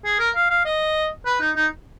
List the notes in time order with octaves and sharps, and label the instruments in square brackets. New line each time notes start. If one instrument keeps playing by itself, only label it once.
[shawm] G#4
A#4
F5
F5
D#5
B4
D#4
D#4